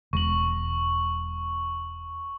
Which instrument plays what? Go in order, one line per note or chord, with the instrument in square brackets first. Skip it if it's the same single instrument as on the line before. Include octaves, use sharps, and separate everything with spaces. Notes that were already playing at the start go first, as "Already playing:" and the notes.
[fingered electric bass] E1 [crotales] C#6 F#7